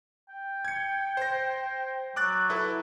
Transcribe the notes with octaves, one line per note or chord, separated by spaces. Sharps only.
G5
G#6 C#7
C5 A#6
F#3 D6 F#6 A6
E4 A4 B4